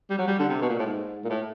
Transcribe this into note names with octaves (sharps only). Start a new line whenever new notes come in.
G3
F#3
G3
D3
C3
B2
A#2
A2
G#2
A#2
A2